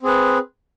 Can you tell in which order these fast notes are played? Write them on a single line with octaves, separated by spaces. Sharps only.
C4 G#4 B4